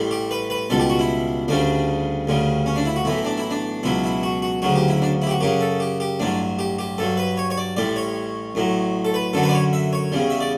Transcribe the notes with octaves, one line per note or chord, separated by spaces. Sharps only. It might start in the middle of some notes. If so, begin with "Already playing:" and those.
Already playing: A1 A2 G3
G4
B4
B4
C#2 B2 G3 A4
G4
F#4
E4
D2 C#3 G3 D4
D2 C#3 G3
C#4
D4
E4
F#4
B1 A2 E3 E4
D4
E4
D4
C#2 B2 F#3 E4
E4
F#4
F#4
D2 C#3 F#3 F#4
G4
E4
D4
E4
G4
F#4
F#2 C#3 F#3 G4
A4
G4
G4
A1 G2 F#3 D4
G4
G4
G2 F#3 A4
B4
C#5
C#5
D5
A1 A2 G3 D5
C#5
A1 A2 F#3
A4
B4
F#2 D3 F#3 A4
B4
D5
C#5
E5
C#5
E2 C#3 G3
E5
D5